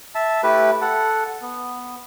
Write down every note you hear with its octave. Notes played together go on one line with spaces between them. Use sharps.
E5 A5
A3 E4 G4 B4
A4 F#5
B3